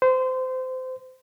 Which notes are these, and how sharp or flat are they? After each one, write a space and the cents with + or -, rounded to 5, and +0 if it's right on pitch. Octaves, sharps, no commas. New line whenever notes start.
C5 -25